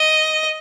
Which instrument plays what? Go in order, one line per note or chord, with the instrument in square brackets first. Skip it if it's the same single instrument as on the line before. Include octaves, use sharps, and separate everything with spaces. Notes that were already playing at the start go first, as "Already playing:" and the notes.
Already playing: [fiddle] D#5